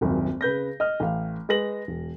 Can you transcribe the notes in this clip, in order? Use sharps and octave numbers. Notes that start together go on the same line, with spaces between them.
D#1 G#1 F#2
C#3 B4 G6 A#6
D#5 F6
A1 F5
G#3 B4 A#6 F#7
E1